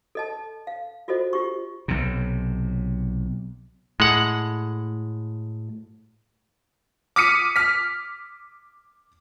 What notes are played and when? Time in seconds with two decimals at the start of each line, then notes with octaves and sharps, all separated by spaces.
0.15 A4 D#5 A5
0.67 F5
1.08 F4 F#4 A4 C5 D#5
1.33 F4 G4 C#6
1.88 B1 C3
4.00 A2 G#3 F#5
7.16 D6 D#6 F6 B6 C#7 D#7
7.56 F6 B6